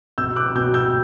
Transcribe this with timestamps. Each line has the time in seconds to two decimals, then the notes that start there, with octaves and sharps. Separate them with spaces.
0.18 B2 E6 G6
0.36 D6 F#6
0.55 B2 E6 G6
0.74 E6 G6